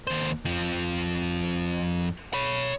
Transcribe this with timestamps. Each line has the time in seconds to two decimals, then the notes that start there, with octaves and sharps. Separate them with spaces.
0.07 D#2 C5
0.45 F2 F3
2.34 C#5 B5